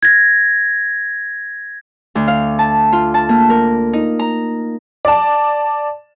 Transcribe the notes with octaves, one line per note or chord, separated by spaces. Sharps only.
G#6 A#6
D2
F5
A5
F4
A5
A#3
A#4
D#4
A#5
D5 A5